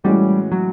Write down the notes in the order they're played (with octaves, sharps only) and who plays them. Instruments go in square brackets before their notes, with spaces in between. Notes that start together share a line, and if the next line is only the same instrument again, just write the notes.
[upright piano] A2 E3 G#3 C#4 F#4 [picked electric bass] G3
[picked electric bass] F#3